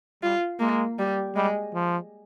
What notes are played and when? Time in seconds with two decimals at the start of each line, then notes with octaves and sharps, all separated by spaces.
0.23 G3 F4
0.60 G#3 A#3
0.99 G3
1.36 G3 G#3
1.74 F3